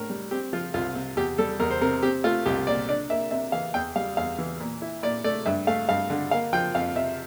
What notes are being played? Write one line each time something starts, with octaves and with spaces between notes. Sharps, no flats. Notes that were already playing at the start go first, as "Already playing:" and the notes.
Already playing: A2 D4 A#4
G3
C4 G4
F3 F4
C2 F4
C3
E2 G4
G3 A4
E2 A#4
C5
C3 A#4
C4 G4
A3 F4
C2 G4
A#2 D5
D4 D5
A#3 E5
C3 E5
E3 F5
E2 G5
G3 F5
E2 F5
E3
A#2
E4
A#2 D5
A3 D5
G2 E5
A3 F5
G2 F5
D3
A#3 F5
F3 G5
F2 F5
C3 E5